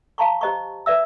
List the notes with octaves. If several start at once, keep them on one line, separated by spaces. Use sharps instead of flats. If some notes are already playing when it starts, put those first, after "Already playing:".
F5 A5 A#5 C6 C#6
G4 C5 D#5 A#5 C#6
B4 D5 E5 E6